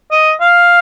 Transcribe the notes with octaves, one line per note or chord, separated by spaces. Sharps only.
D#5
F5